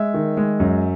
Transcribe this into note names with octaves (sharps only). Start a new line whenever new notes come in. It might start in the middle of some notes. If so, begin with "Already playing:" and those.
Already playing: G#3 E5
D#3
G#3
F#2